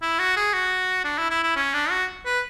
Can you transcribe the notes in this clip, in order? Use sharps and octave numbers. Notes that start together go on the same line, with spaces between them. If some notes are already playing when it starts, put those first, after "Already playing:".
E4
F#4
G#4
F#4
D4
E4
E4
E4
C#4
D4
F#4
B4